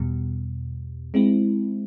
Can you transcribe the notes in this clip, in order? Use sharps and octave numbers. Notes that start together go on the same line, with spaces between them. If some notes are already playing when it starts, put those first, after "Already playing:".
Already playing: E2 B2 G3
G#3 C4 E4